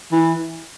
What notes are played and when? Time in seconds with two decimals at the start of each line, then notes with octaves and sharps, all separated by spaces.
0.12 E3